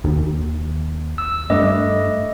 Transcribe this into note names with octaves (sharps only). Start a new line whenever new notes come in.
D#2
E6
G2 A3 D#5